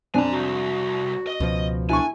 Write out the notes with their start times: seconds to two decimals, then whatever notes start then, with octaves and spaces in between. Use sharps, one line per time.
0.14 F2 D4 G#5 A#5
0.32 C2 F#4
1.27 D#5
1.40 C#2 B2 F3
1.89 D4 E4 G#5 C#6